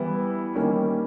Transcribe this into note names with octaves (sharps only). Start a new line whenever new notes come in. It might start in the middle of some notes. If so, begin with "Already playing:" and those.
Already playing: E3 G3 B3 E4
D#3 G3 A#3 C#4